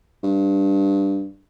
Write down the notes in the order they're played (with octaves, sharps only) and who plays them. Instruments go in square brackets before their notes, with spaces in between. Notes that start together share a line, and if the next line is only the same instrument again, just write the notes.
[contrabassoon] G2